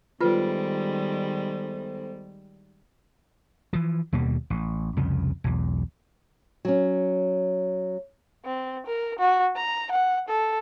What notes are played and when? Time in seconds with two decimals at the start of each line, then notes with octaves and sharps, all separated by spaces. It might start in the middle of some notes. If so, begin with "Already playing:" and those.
0.21 D#3 G3 G#3 B3 F4 A4 B4 C5
3.73 E3 F3
4.13 D#2 B2 G3 A#3
4.50 A1
4.97 C2 F2 C#3
5.44 B1 E2
6.65 F#3 C#4
8.45 C4
8.86 A#4
9.19 F#4
9.56 A#5
9.91 F#5
10.28 A4